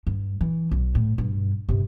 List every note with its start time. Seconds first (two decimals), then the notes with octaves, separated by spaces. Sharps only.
0.07 G2
0.41 E3
0.71 B1
0.95 A2
1.18 G2 B2
1.69 G2 C3